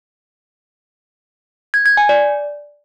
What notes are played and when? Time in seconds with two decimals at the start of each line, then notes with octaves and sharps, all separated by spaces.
1.74 G#6
1.86 G#6
1.97 G#5
2.09 D5